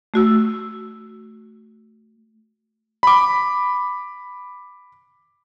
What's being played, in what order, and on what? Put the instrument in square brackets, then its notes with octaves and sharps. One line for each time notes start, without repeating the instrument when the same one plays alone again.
[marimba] A3 F#4 E6
[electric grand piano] B5 D6